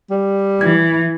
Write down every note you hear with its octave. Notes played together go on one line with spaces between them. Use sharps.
G3
E3 G#6